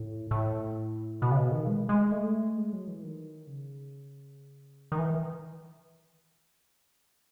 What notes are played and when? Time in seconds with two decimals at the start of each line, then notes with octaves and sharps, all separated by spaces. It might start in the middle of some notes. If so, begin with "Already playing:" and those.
Already playing: A2
0.31 A2
1.22 B2
1.31 C#3
1.37 B2
1.52 D#3
1.67 G#3
1.89 G#3
2.12 A3
2.57 G#3
2.73 F#3
2.88 E3
3.03 D#3
3.47 C#3
4.92 D#3
4.98 E3